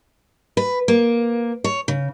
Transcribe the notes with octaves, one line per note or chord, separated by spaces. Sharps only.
B4
A#3
C#5
C#3